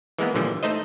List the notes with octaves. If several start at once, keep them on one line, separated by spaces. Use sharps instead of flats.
E3 G#3 A#3 B3
A#2 D3 E3 F3 G3
A3 D#4 C5 D#5